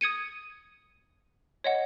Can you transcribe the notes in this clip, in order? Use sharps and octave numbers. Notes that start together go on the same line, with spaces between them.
D#6 G#6 C#7 D#7
C#5 D#5 F#5